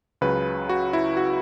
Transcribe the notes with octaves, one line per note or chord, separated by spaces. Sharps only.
C#2 C#3 F#3 B4
F#4
E4
F#4